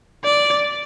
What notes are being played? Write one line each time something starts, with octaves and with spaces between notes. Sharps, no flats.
D5